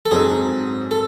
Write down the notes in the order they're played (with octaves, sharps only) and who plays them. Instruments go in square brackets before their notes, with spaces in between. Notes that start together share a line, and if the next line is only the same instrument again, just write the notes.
[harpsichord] A4
[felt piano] G#2 F#3 C4 D#4 [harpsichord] G#4
[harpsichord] A4